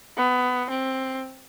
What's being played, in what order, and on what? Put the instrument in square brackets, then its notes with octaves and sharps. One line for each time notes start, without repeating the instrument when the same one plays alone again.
[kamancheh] B3
C4